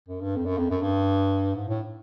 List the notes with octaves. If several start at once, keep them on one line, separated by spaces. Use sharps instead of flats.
F#2
G2
F2
F#2
F2
F#2
G2
G#2
A2